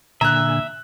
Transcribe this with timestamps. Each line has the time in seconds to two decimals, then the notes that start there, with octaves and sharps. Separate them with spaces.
0.21 A#2 D3 E5 G#5 A#5 F#6